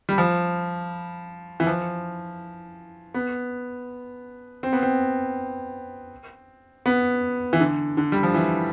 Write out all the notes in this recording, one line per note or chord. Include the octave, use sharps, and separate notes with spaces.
G3
F3
E3
F3
B3
C4
B3
C4
B3
E3
D3
D3
G3
F3
E3